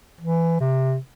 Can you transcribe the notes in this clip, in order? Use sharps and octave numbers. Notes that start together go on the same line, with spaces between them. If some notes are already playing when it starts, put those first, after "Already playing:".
E3
C3